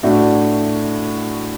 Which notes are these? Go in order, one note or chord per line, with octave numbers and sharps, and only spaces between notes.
A2 A3 D4 F#4